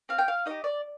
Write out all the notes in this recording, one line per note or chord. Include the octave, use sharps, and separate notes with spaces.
C4 F5
G5
F5
D#4 G4 D#5
D5